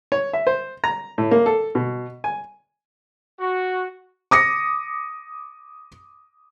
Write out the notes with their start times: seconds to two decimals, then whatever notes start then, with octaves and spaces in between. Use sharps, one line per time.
0.12 C#5
0.33 E5
0.47 C5
0.84 A#5
1.18 A2
1.31 A#3
1.46 A4
1.75 B2
2.24 G#5
3.40 F#4
4.31 D6 D#6 A#6 C#7